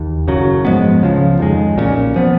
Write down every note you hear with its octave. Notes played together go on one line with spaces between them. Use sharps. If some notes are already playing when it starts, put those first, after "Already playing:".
Already playing: D#2
F#1 F#2 C#3 F#3
G#2 F3 G#3 B3
C#2 C#3 F3
F2 D#3 G#3
B1 A#2 F#3 C#4
F3 B3